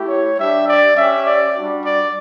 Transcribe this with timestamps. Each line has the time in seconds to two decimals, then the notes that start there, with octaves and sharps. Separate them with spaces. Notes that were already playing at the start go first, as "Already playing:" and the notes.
Already playing: A3 E4 G4
0.08 C#5
0.37 G3 D4 G4 E5
0.67 D5
0.95 C#4 G4 E5
1.25 D5
1.54 G3 D4 F#4
1.84 D5